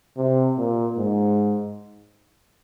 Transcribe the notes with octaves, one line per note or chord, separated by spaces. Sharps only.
C3
A#2
G#2